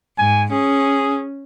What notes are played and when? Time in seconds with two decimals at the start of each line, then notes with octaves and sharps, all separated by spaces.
0.18 G#2 G#5
0.52 C#4 G#4